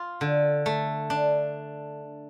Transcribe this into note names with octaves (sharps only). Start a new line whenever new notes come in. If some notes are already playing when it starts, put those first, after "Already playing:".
Already playing: F4
D3
A3
D4